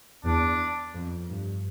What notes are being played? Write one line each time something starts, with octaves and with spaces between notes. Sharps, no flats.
E2 D4
F2
G2